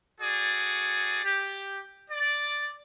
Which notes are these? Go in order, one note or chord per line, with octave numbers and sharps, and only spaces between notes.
F#4 G#4 A4 D5
G4
D5